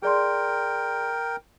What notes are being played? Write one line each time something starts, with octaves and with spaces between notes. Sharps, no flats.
G#4 A#4 D5 G5 C6